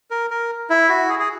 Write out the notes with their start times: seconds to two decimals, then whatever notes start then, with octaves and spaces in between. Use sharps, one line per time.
0.11 A#4
0.30 A#4
0.70 E4
0.89 F#4
1.09 G#4
1.19 G#4